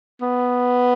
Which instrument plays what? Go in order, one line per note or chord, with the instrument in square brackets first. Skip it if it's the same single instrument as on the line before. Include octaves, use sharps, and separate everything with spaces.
[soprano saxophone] B3